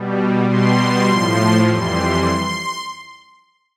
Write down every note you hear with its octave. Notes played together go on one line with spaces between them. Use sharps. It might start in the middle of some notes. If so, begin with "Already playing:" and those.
Already playing: B2 G3
B2 G3 C6
A2 F3
F2 E3 G3 C6